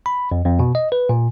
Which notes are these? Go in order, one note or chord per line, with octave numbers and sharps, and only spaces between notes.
B5
F2
F2
B2
D#5
B4
A#2